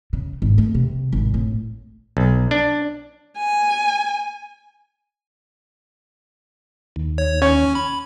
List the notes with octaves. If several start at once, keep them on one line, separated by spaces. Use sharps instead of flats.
C#3
G#1
A3
C3
G#1
A2
B1
D4
G#5
D#2
C#5
C#4 C#5
B5